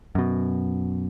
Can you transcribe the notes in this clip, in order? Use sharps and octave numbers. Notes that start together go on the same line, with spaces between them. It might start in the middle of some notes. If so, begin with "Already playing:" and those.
F#2 B2